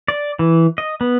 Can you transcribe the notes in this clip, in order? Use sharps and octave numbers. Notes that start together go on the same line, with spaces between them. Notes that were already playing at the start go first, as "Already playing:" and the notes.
D5
E3
D#5
B3